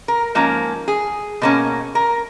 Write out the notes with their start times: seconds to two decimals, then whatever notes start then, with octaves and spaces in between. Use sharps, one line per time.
0.08 A#4
0.35 G#2 F3 A#3 C#4
0.88 G#4
1.42 B2 A#3 C#4
1.95 A#4